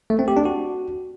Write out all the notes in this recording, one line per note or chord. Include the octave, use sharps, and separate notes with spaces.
A3
C4
G4
D4
F#4